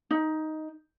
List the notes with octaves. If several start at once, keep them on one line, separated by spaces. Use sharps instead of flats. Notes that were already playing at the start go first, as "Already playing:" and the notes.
D#4